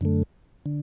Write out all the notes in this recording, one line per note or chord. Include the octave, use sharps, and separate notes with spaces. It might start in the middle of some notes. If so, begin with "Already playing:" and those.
F#2 D3 A3
D3